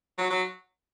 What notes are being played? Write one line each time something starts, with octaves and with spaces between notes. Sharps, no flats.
F#3
F#3